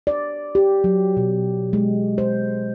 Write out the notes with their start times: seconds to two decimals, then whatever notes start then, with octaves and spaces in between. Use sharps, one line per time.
0.07 D5
0.55 G4
0.84 F#3
1.17 B2
1.73 G#3
2.18 C5